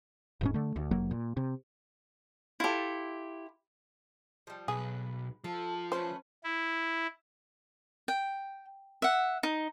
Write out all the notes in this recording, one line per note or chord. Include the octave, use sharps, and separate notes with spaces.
D#1 G#2 C#4
D3 A3
D2
F1 F#3 A#3
A#2
C3
E4 F4 G4 A4
F3 G3
B1 G#4 B4
F3 A4
A3 C#4 B4 C5
E4
G5
E5 F#5
D#4